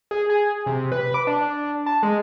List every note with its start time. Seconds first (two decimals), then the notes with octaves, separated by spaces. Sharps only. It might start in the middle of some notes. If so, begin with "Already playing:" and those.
0.11 G#4
0.30 G#4
0.66 C3
0.92 B4
1.14 D6
1.27 D4
1.86 A5
2.03 G#3